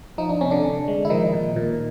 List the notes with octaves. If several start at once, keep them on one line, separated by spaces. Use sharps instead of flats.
F3 D#4
D4
C3 C#4
D3 D4
C3
G#3
E4
D#3 F3 D#4
A#2
A#2